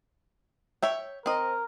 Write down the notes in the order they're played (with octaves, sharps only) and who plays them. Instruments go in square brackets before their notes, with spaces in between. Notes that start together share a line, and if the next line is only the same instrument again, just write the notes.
[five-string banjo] C#5 E5 G5
[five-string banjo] C4 D#5 [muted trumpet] A#4